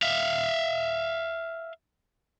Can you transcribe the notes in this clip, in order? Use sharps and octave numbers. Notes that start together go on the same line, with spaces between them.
E5 F5